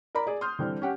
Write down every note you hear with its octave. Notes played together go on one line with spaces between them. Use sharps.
A#4 D5 A#5 B5
G#4 D5
C6 D#6 F6 G6
D3 E3 G3 C4
C#4 G4 F#5